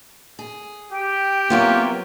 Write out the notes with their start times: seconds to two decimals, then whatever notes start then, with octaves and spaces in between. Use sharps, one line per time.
0.39 G#4
0.92 G4 G5
1.50 C3 F#3 A#3 B3 F4